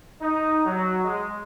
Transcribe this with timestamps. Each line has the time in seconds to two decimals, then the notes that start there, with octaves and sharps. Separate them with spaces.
0.21 D#4
0.65 F#3
1.05 G#3